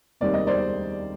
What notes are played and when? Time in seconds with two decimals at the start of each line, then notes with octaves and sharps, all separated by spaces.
0.21 F1 D#2 D#3 G3 C4 D5
0.34 D#5
0.47 C5 D5